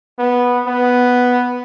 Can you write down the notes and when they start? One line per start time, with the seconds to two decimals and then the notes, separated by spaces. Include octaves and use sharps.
0.19 B3
0.66 B3